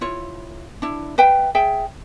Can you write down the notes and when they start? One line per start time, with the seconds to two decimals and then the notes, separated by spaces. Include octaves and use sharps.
0.01 E4 F4 C#5
0.82 D4 E4
1.18 B4 E5 G5
1.55 G#4 E5 G5